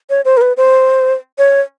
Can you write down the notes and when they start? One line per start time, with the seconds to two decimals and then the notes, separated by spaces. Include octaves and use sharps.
0.10 C#5
0.25 C5
0.37 A#4
0.41 B4
0.57 C5
1.38 C#5